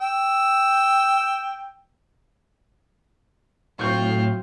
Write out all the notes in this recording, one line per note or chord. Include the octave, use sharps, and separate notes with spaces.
G5 E6
A2 F#3 C4 F4 C#6 G6